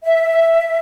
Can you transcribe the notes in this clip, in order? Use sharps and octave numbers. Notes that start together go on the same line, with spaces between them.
E5